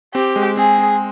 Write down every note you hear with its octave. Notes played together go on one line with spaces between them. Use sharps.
C4 G4
G#3
C4 G#4
C4